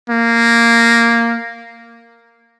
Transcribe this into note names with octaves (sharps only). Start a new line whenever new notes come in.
A#3